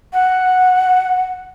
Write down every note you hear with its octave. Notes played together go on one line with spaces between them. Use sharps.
F#5